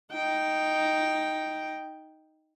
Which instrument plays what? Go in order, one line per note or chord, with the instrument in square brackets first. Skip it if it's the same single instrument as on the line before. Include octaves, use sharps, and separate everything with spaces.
[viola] D#4 G5